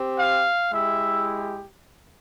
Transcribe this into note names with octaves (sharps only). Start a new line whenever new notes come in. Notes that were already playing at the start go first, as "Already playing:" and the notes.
Already playing: C4 G4
F5
G#3 E4 G4 E5